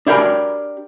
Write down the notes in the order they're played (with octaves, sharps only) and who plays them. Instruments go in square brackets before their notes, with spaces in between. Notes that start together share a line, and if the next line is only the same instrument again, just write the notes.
[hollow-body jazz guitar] D4 E4 G4 A#4 B5